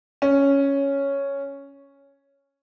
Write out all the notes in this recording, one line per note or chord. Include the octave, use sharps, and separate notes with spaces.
C#4